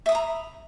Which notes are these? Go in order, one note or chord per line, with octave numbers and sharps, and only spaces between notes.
E5 A#5 B5 D#6